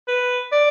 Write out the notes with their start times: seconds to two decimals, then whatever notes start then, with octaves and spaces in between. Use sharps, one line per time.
0.08 B4
0.52 D5